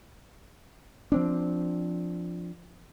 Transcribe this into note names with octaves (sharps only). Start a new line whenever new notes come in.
F3 C4 D4